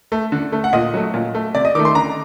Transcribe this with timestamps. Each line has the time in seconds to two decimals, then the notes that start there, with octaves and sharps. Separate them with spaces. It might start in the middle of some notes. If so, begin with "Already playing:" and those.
0.12 A3
0.32 D3
0.52 A3
0.64 F#5
0.73 A#2 D#5
0.94 F#3 A3
1.14 A#2
1.35 A3
1.55 C3 D5
1.65 D#5
1.75 D#3 D6
1.79 A3
1.85 C6
1.95 D3 A#5